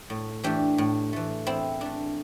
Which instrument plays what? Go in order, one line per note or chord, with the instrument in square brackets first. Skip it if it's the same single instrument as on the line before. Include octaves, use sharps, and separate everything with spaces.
[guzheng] A2
E3 A3 D4 G4
A2
E3 A3
E2 C4 E4
E3 A3 D4